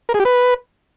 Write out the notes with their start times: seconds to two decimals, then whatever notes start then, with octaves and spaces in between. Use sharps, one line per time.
0.09 A#4
0.14 G#4
0.20 G4
0.25 B4